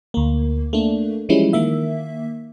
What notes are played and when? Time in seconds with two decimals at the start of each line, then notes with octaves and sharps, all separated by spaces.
0.14 D2 A#3
0.73 A3 A#3 D4
1.29 E3 F3 G3 G#3 C#4 E4
1.53 D#3 A#3 E5